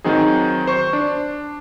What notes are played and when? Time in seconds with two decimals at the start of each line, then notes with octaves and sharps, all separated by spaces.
0.04 D#3 F#3 C4 D#4 G#4
0.67 C5 C#6
0.93 D4